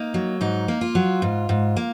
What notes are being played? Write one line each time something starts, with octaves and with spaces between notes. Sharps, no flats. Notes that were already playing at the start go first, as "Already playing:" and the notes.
Already playing: A#3 D#4
F#3
G#2 D#4
A#3
F4
F#3
G#2
G#2
A#3